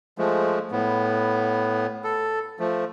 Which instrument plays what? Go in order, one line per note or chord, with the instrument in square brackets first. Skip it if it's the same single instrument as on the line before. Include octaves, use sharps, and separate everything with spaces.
[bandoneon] F3 G#3 A3
A2 B3
A4
F3 A3